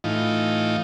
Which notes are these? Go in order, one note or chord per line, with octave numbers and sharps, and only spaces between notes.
A2 E3 D#4 F4